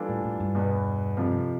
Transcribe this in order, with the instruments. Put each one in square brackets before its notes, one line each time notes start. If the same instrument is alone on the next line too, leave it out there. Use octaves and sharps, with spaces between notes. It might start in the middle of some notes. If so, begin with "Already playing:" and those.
Already playing: [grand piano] E3 G3 D4 F4 A4
[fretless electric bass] A2
A2
G2
[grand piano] E2 B2 B3
F2 C3 F3